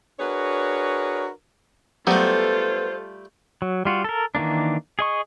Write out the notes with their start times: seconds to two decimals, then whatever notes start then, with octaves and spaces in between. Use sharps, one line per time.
0.20 D4 F#4 G#4 A#4 B4 C#5
2.07 F#3 G3 A3 B3 F4 A4 C5
3.62 F#3
3.85 G3 F4 F#4
4.04 A4 A#4
4.35 D#3 E3 A#3 D4
4.99 G#4 D#5 C#6